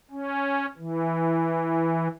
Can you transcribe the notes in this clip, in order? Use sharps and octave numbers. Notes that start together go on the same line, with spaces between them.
C#4
E3